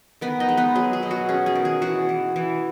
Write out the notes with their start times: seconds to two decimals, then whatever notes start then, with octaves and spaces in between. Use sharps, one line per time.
0.21 D#3 B3 B4
0.40 D#4 D#5
0.49 G#3
0.57 B3 B4
0.75 F#3 G#4
0.93 G#4
1.03 B2
1.11 F#4
1.29 C#4 G#4
1.46 G#4
1.55 D#3
1.65 G#4
1.82 E3 F#4
2.09 E3
2.36 E3